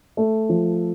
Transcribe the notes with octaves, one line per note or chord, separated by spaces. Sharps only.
A3
F3